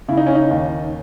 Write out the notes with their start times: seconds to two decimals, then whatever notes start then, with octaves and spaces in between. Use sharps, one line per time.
0.08 C#3 E4
0.18 D#4
0.27 C#4
0.35 D#4
0.51 D#2